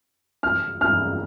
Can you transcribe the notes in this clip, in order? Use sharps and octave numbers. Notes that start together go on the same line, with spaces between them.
F6
F6